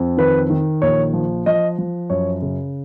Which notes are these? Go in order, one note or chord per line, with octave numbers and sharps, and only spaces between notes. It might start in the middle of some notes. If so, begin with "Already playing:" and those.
Already playing: F2
D#3 B4
D#3
A#1 C#5
F3
F3 D#5
F3
F#2 C#5
C#3